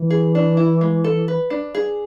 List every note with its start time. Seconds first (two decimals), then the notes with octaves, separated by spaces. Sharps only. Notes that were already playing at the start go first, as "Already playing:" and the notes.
Already playing: E3
0.10 G#4
0.35 D4
0.57 E4
0.81 G#3
1.04 A4
1.28 B4
1.50 D4
1.75 G#4